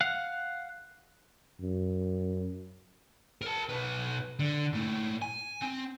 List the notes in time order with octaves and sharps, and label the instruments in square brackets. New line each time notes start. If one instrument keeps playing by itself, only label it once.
[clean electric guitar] F5 F#5
[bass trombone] F#2
[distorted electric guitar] A#4 A5
B1 B4
D3
A#2 A3
G#5
C4